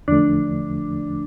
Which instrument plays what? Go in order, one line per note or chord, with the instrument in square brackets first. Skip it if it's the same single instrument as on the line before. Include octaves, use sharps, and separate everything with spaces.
[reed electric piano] E2 D3 F3 A3 [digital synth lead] D4